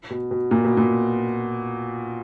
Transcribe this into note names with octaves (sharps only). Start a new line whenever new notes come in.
B2
B2
A#2
B2
A#2